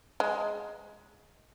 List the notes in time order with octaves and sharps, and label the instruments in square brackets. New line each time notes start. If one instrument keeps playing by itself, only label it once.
[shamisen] G#3